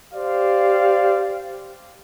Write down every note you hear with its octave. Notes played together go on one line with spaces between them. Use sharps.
G4 C5 D5 F5